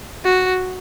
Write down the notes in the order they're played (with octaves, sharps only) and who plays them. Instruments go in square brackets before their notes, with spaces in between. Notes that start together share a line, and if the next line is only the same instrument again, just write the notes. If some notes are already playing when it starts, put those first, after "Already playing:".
[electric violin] F#4